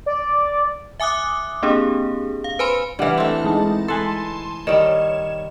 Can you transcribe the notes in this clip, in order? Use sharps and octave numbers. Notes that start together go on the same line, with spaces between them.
D5
E5 G#5 D6 D#6 F#6
A#3 C4 D4 G4 G#4
F5
B4 C5 G#5 B5 C6
E3 G3 D4 F#5 F6
A3 C4
G#3 D#4 A5
A4 B4 G#5 A5 C6
D#3 G3 C#5 E7